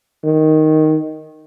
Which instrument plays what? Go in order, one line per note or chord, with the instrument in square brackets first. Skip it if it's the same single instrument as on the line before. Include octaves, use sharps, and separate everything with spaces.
[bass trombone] D#3